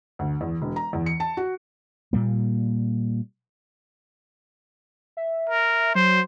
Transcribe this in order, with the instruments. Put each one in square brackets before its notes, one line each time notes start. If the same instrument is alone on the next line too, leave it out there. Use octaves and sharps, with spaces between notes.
[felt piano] D2
E2
E1
A#5
E2
C#7
A5
F#4
[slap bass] A#2 G3 A#3
[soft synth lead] E5
[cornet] A#4
[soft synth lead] F#3 [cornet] C5